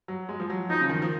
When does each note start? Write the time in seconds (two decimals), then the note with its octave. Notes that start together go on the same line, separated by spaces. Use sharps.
0.08 F#3
0.29 G#3
0.40 F3
0.50 F#3
0.70 F3 D#4
0.81 C#3
0.89 D#3
1.02 F3